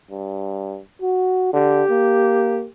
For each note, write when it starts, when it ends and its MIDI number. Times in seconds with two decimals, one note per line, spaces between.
0.11 0.79 43
1.01 1.51 66
1.53 1.83 50
1.53 2.67 67
1.90 2.66 58